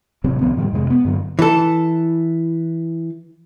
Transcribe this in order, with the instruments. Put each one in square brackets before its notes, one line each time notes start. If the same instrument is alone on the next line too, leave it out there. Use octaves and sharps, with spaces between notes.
[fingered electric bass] A1 C3 F#3 C4
C2 D3 F3 B3
A2 D#3 F#3 G3
F2 C3 G#3
B3
G2 D3 F#3
[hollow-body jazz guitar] E3 A4